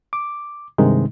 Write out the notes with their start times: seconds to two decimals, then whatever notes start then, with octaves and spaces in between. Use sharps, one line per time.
0.13 D6
0.78 G2 C3 D#3 G#3 D#4